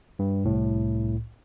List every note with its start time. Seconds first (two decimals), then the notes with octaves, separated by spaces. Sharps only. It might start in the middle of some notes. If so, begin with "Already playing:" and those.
0.19 G2
0.45 C2 A2